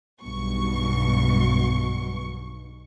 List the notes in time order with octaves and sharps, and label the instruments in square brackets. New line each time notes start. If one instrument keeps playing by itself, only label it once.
[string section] B1 G2 B2 C#6